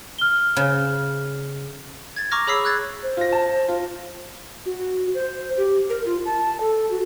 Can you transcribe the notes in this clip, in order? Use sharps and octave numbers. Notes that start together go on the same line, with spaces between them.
F6 G7
C#3
G#6 A6
A#5 C#6 D6 F6 A#6
G#4 C#5 B5 E6 B6 C7
E6 F#6 G#6 A6
C5
F4 A#6
A5
F4
F#4
C5
G4
A#4
F4
A5
A4
F#4